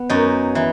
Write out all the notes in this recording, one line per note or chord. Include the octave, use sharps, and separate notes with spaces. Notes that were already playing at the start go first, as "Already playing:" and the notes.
Already playing: B3
F#2 D#4
E3